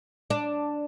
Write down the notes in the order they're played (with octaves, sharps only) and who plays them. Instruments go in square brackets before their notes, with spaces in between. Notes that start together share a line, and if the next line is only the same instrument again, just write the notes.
[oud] D4